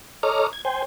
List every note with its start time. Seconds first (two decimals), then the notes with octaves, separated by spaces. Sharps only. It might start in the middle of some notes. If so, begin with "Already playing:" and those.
0.23 A4 C#5 D#5 A#5 D6 F6
0.53 G#6
0.65 C5 G5 G#5